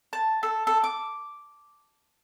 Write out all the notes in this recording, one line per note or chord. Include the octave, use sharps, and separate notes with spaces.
A5
A4
A4
D6